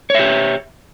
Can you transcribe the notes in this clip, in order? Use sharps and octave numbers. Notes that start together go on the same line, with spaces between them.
G4 C#5 E5